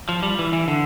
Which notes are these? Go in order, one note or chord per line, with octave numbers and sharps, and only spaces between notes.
F3
G3
E3
E3
D3